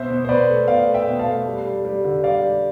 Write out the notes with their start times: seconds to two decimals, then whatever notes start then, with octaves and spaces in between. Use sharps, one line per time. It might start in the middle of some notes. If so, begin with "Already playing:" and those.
Already playing: B2 C5 E5
0.10 B2
0.25 C5
0.29 B2 B4 D5
0.49 A3
0.68 B2 D5 F5
0.87 A3
0.94 E5 G5
1.07 B2
1.19 F5 A5
1.27 A3
1.46 G3
1.65 G3
1.85 G3
2.05 D3
2.23 G3 D5 F5
2.43 G3